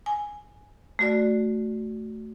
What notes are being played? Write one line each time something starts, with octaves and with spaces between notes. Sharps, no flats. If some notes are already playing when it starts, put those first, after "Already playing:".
G#5
A3 F#4 D5